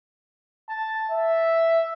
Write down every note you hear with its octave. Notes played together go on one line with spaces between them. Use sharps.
A5
E5